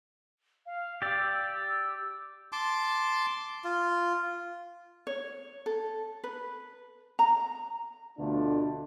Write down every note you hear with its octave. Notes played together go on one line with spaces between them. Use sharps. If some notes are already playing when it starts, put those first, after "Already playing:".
F5
G4 D5 E6
E6
A5 C6 D6
F4
C#5
A4
B4
A#5
D2 B2 D3 A3 D4 F4